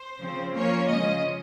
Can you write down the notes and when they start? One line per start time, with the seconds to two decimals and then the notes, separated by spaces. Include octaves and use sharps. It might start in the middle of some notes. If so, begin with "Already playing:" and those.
Already playing: C5
0.18 C#3 F3 C4
0.53 F3 A#3 C#4 C#5
0.88 C#3 F3 G#3 C#4 D#5